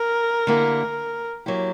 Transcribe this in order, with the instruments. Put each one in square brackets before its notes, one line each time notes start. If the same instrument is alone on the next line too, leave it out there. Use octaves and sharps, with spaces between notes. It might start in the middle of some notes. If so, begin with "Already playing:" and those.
Already playing: [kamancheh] A#4
[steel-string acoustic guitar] D3 A#3 E4 G4
F#3 A#3 E4 G4